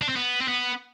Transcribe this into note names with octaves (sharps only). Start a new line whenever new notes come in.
D4
C4
B3
C4
B3